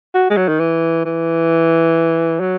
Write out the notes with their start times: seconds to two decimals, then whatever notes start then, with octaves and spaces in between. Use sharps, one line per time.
0.14 F#4
0.30 G#3
0.37 F#3
0.48 D#3
0.59 E3
1.05 E3
2.40 F#3